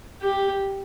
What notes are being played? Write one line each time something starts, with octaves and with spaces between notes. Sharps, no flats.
G4